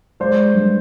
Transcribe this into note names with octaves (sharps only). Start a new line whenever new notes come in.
G#3 C5 D5
G2